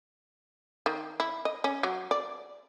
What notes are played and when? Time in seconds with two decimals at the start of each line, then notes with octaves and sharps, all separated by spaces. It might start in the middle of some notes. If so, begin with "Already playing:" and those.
0.86 D#3
1.20 E4
1.45 D#5
1.64 C#4
1.83 F#3
2.11 D5